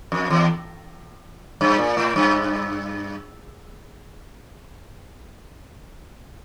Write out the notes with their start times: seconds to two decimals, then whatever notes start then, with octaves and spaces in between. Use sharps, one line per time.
0.12 F2
0.30 E2
1.61 G2
1.78 A#2
1.97 A2
2.16 G2